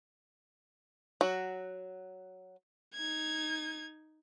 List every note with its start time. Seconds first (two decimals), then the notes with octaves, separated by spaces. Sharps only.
1.21 F#3 F#4
2.94 D#4 G#6